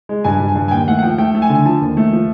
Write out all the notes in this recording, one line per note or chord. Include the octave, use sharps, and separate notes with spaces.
G#3
G2 G#5
G2
G#5
G2
G#5
D#2 G5
A3 F#5
F#5
F3 G5
A3 G5
A3
G#5
D3
G#5
F3 A5
D#2
A3
F3